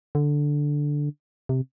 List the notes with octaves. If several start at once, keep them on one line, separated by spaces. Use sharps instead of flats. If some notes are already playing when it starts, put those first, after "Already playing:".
D3
C3